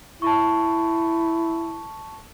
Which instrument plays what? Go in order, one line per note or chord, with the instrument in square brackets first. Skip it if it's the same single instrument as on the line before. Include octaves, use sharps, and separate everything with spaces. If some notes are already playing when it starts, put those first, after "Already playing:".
[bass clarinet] E4 [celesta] A5 C#6